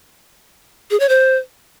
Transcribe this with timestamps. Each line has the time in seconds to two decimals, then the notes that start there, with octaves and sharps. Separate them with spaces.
0.91 G#4
1.00 C#5
1.09 C5